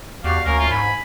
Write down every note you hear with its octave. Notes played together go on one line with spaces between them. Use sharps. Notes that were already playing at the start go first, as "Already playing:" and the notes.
E2 F#4 G4 D5 F5
D2 A#3 C#4 A#4 F5
F4
G#2 G#5 B5